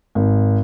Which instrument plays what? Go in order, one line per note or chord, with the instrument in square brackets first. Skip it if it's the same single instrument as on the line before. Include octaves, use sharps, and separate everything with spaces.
[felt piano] G#1